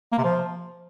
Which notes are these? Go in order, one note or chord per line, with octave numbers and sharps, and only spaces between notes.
A#3
C3
F3